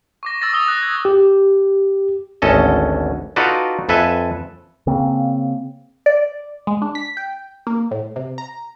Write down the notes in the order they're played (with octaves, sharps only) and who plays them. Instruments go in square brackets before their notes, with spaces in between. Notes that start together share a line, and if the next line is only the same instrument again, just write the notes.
[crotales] C#6 D6 A#6
C#6 E6 A6 A#6
D#6 E6 G7
F#6 A6
G#6
[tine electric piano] G4
[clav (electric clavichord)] G#1 D2 C#4 A4 D#5
D#4 F4 F#4 A4 B4 D5
F2 A4 B4 E5 G#5
[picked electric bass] C#3 A#3 C4
[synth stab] D5
G#3
D4
B6
G5
A#3
A2
C3
A#5